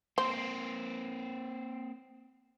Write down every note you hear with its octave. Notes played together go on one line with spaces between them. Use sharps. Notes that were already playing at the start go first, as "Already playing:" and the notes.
A#3 C4 C5